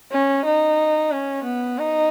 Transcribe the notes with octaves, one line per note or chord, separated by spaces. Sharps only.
C#4
D#4
C#4
B3
D#4